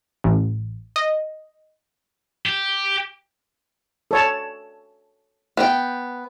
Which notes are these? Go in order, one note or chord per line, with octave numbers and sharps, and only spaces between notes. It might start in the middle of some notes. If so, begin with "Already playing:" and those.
A1
D#5
G4
A4 C#5 A5
B3 G5